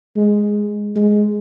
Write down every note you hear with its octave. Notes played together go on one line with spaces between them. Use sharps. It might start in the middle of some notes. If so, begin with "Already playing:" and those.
G#3
G#3